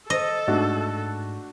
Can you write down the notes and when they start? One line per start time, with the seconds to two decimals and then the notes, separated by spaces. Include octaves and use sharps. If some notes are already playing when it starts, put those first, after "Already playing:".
0.10 A4 D#5
0.48 G#2 A3 D4 F#4